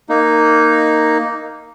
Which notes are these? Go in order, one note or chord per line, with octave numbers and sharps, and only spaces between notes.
A#3 D#4